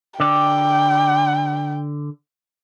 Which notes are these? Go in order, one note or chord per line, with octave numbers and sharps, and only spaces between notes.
D3 D5 G5